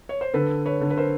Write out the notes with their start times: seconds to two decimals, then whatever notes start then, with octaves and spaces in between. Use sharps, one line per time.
0.09 C#5
0.21 C5
0.34 D3 A4 B4
0.66 B4 C#5
0.81 D3
0.90 B4
0.97 A#4 C5